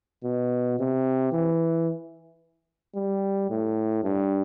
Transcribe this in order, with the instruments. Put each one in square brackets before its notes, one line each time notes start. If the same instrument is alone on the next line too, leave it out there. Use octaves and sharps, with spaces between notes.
[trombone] B2
C3
E3
G3
A2
G2